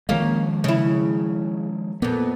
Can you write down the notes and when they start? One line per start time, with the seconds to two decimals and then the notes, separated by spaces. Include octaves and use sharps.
0.09 D#3 F3 G#3 A#3 C#4 F5
0.64 C#3 E4
2.02 F2 A#2 B3